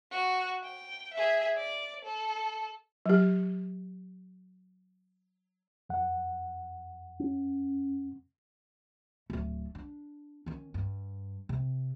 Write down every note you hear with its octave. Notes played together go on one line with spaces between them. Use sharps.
F#4
G5
G#4 E5
D5
A4
F#3 G4
F2 F#5
C#4
D1 A3
D4
D#3 C#4
G2
C3